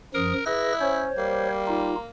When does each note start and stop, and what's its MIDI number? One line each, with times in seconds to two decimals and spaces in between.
0.14 0.33 42
0.14 0.33 53
0.14 0.44 70
0.14 0.33 87
0.46 1.04 64
0.46 0.73 68
0.46 0.73 71
0.46 0.73 94
0.81 1.11 61
0.81 1.48 72
0.81 1.48 73
1.18 1.99 55
1.18 2.09 58
1.67 1.95 63
1.67 1.95 65